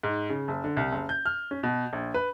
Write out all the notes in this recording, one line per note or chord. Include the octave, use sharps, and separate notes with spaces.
G#2
C#3
F#1
D3
C2
F#1
G6
F6
C#4
B2
A#1
B4